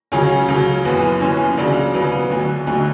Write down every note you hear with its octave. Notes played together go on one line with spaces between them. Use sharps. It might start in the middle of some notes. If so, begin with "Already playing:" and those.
C#2 C#3 F#3 C#4
C#2 C#3 F#3
F#1 F#2 E3 B3
F#1 F#2 E3 C#4
C#2 C#3 F#3 D4
C#2 C#3 F#3 B3
B3
D2 D3 F#3
D2 D3 F#3